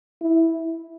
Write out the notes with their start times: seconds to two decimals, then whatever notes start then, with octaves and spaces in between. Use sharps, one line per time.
0.22 E4